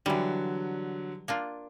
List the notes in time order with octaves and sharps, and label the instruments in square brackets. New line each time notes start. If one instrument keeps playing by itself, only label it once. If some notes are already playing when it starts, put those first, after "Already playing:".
[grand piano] D3 F#3 [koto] E3 G3
[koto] A#3 D4 F4